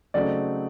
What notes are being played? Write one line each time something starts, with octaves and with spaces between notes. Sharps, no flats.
C#3 F#3 A3 C4 D#4 D5